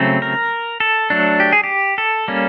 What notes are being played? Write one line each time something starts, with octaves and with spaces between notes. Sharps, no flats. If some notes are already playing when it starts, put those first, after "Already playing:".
Already playing: C#3 F#3 A3 C4
A#4
A4
F#3 A3 D4
G4
G#4
G4
A4
G3 A#3 C#4